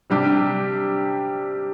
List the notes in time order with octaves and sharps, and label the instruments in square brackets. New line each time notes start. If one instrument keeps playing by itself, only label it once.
[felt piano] C3 G3 D4 G4